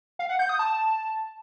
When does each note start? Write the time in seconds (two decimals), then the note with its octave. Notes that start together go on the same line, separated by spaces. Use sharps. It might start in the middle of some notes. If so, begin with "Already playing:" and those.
0.19 F5
0.29 F#5
0.39 G6
0.49 D#6
0.59 A5